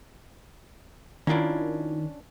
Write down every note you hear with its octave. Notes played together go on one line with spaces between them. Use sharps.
D#3 C#4 D4 E4 F4 A#5